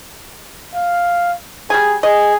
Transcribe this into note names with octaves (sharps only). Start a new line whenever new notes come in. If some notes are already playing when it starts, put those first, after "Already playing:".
F5
G3 G#4 G#5
G#4 D#5